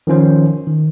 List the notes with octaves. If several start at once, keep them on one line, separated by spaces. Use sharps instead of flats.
D#3 F3 C#4 C5
D#3